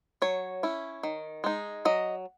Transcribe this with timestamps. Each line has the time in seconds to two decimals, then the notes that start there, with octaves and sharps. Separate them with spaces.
0.22 F#3 C#5
0.63 C#4 E4
1.03 D#3
1.44 G#3 D#4
1.85 F#3 D#5